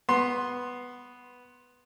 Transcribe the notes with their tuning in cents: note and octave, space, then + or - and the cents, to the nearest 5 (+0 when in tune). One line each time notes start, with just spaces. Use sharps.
B3 +0 C6 +10